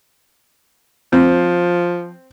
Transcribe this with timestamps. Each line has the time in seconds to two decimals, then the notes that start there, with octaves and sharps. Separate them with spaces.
1.13 F3 C4